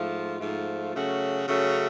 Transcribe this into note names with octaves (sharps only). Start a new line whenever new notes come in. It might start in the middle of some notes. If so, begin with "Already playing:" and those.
Already playing: G#2 F3 A3 F4
G#2 F3 A3 F4
C#3 F#3 A3 C#4 F#4
C#3 F#3 A3 C#4 F#4